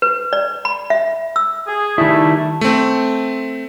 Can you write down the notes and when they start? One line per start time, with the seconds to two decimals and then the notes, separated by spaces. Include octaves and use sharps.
0.02 B4
0.33 D5
0.65 B5
0.90 E5
1.36 E6
1.67 G#4
1.98 D#3 G3 A3 E4
2.61 A3 C4